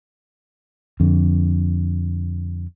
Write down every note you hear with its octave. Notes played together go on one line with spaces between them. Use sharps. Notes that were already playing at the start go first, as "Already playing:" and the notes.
F2 D3